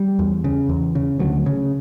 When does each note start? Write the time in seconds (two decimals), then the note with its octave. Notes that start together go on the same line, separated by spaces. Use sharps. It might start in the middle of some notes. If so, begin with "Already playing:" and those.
Already playing: G3
0.19 E2
0.44 C#3
0.69 E2
0.95 C#3
1.19 D2 F#3
1.46 C#3